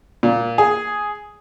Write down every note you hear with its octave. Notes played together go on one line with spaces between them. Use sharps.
A#2
G#4